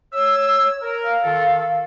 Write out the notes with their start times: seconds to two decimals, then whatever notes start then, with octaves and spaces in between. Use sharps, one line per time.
0.13 C#5 E6
0.82 A#4
1.04 F5
1.24 D#3 F4 A4